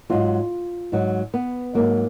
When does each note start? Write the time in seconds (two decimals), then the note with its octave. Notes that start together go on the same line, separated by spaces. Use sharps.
0.10 G#2 F#3 F4
0.92 G#2 F#3
1.34 B3
1.75 G#2 F#3 A#3